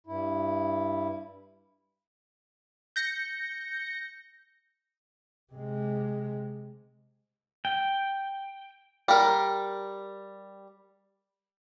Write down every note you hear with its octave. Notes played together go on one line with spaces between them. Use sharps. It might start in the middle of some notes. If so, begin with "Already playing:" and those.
G2 E4
G6 A#6 C#7
C3 G#3
G5
G3 A#4